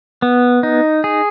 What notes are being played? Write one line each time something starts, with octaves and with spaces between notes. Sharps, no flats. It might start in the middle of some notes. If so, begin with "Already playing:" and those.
B3
D#4
G#4